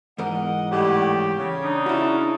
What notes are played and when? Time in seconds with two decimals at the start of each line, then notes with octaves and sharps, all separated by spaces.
0.18 E2 G#2 A#4 D#5 F#5
0.71 A2 C#3 G3 G4
1.38 C#3
1.64 D4 D#4
1.86 E4 F#4